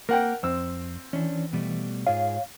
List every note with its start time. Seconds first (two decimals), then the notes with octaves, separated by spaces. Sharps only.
0.09 A#3 A#4 F#5 G5
0.43 F2 C4 E6
1.13 E3 C#4 D4
1.53 B2 G3 A3
2.07 G#2 F4 G#4 C#5 F5